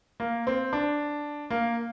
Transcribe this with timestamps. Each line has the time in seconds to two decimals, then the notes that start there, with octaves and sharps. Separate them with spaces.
0.20 A#3
0.47 C4
0.73 D4
1.50 A#3